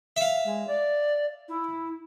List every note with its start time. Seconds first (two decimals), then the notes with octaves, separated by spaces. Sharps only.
0.16 E5 F5
0.45 G#3
0.67 D5
1.48 E4